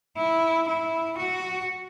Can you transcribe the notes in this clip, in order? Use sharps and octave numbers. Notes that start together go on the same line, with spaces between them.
E4
E4
F#4